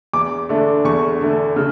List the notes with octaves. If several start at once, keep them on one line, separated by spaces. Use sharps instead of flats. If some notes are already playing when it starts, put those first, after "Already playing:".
E2 D6
D3 A3 D4
E2 C#6
D3 A3 D4
C#3